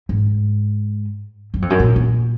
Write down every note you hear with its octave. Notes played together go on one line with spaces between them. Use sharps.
G#2
F#2
F2
F#2
A#2
A#2